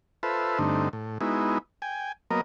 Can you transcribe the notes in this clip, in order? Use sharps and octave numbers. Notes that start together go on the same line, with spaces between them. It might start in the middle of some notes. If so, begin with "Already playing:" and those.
F4 A4 B4 C5 E5
G2 D3 A3 C4 D#4
A2
G#3 B3 D#4 E4 F#4
G5 G#5
F#3 A#3 B3 A#4 D#5